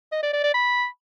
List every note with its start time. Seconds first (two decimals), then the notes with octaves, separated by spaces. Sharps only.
0.12 D#5
0.23 D5
0.33 D5
0.44 D5
0.54 B5